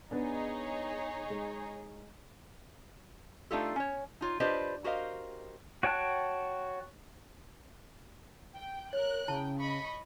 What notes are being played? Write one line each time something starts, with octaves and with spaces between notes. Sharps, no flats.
B3 D4 D#4 G#4 C#5
G#3
A3 D4 D#4 F4 G4 A4
C#4 C#5
D#4 F4 C#5
D4 F4 G4 B4 C5 D#5
F#4 G4 A#4 C5 D#5 F5
F#4 C#5 G5 A5 F#6
G5
A#4 C#5 F#6
C#3 E4 G5 A5
D#5 B5 C#6